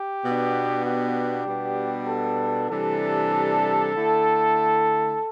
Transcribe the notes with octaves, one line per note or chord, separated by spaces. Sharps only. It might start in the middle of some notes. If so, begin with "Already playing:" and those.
Already playing: G4
B2 B3 D4
G4
B2 G3 B3 D4
A4
C3 E3 G3 D4 A4
D3 A3 E4